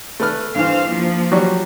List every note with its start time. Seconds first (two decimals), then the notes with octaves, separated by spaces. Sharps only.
0.20 A3 B4 F6
0.55 G2 E3 C5 F5
0.90 F3 A#3
1.32 F#3 G3 C#6